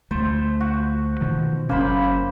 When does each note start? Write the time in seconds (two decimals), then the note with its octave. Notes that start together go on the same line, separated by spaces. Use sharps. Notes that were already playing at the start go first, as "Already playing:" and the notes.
0.11 D2 A3 C5
0.60 F#4
1.21 B2 D#3 F3
1.69 F#1 A#3 C#4 C5 B5